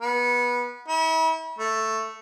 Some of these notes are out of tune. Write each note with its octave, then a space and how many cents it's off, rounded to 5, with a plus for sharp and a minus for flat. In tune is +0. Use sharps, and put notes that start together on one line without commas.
B3 -20
E4 -40
A3 +5